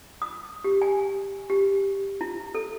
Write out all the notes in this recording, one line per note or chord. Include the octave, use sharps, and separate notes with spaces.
D#6
G4
G#5
G4
E4
A4